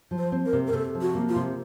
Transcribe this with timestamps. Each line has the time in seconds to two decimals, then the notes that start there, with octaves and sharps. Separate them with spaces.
0.11 F3
0.18 C5
0.32 C4
0.46 A#4
0.53 C3
0.67 A#4
0.73 C3 A4
0.95 F3
1.01 F#4
1.15 A#3
1.29 F4
1.36 C3